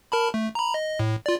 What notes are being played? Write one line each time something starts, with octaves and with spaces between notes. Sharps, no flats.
A#4 A5 B5
A3
A#5 B5
D#5
A2
F4 D5